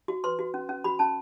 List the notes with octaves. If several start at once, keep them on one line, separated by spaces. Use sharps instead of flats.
F#4
B4 C6
F#4
C#4
C#4
F#4 B5
C#4 A5